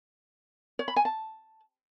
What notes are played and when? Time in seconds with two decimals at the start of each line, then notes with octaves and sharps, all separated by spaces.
0.79 C#5
0.88 B5
0.96 G#5
1.05 A5